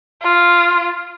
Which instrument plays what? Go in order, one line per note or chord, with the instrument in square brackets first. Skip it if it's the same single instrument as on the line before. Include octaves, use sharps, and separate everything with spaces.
[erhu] F4